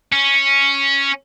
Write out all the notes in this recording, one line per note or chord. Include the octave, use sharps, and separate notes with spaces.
C#4